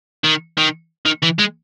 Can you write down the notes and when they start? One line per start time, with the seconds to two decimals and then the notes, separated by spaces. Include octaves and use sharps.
0.24 D#3
0.57 D#3
1.06 D#3
1.23 E3
1.39 G#3